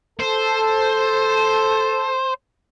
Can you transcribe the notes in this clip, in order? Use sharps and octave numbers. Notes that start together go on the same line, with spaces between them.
A4 C5